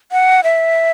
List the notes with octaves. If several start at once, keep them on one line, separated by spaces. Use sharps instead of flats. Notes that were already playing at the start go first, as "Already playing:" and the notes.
F#5
E5